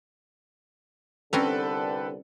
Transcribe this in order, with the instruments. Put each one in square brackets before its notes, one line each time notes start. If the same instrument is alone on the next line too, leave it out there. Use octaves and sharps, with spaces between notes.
[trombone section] C2 D3 [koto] C4 C#4 A#5 [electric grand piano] A4 B4 G5